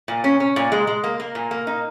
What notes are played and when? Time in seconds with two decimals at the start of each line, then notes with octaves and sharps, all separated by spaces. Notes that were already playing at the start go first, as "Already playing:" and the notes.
0.08 A#2
0.24 C#4
0.40 C#4
0.56 A#2
0.72 G#3
0.87 G#3
1.04 A#3
1.20 A#3
1.35 A#2
1.51 A#3
1.67 D#4